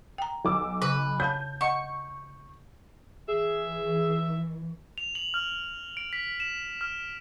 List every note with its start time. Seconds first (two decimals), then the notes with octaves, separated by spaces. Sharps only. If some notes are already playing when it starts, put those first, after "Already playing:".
0.18 G5 A#5
0.45 B1 D6 E6
0.82 C#3 B4
1.20 C#5 F5 A5 G6
1.61 D#5 F#5 C#6
3.28 E3 G#4 E5
4.98 F7
5.15 F#7
5.34 F6
5.97 D7
6.13 B6
6.40 E7
6.81 F6